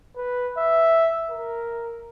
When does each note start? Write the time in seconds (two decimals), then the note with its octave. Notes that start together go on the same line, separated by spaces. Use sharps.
0.16 B4
0.58 E5
1.30 A#4